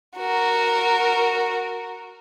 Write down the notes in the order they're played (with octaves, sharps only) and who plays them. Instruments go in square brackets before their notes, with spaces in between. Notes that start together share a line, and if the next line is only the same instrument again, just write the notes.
[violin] F#4 A#4